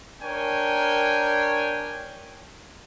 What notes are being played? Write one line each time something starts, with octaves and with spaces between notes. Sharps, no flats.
D4 A#4 C#5 G5 G#5